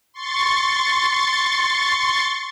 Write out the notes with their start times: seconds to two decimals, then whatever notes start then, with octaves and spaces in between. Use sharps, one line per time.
0.13 C6 C#6 A6